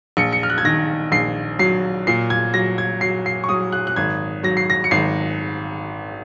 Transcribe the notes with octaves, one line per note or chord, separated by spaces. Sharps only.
A#1 C#7
C#7
F6
F#6
G#6
D#3 A#6
A#1 C7
F#3 C7
A#2 C7
G#6
F#3 A#6
G#6
F#3 C7
C7
C#6
F#3 D#6
F#6
F#6
G#1 G#6
F#3 A#6
C7
A#6
C#7
G#1 C7